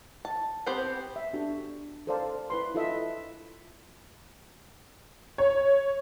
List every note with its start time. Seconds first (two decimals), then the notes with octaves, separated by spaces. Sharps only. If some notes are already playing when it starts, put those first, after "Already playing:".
0.25 A5
0.66 B3 C4 G4 B4 C5
1.16 E5
1.33 D4 F#4 G4 A4
2.07 A4 A#4 C5 D5 F5 A5
2.50 E4 B4 C6
2.75 E4 F4 A4 D#5 E5
5.38 C#5